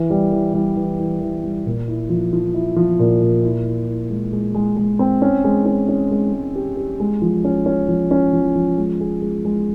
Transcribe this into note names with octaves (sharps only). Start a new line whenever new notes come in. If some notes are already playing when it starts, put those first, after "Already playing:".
Already playing: E3
G3
E3
G3
E3
E3
E3
G3
A#2
E4
F3
F3
E4
F3
A#2
A#2
E4
E4
E4
G#3
G#3
G#3
G#3
C4
C#4
G#3
C#4
C#4
G#3
G#3
G4
G4
G#3
F3
C#4
C#4
F3
C#4
F3
F3
G#3
G#4
G#3
G#3